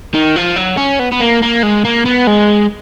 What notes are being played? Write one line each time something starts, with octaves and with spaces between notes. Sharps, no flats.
D#3
F3
F#3
C#4
B3
B3
A#3
A#3
G#3
A#3
B3
G#3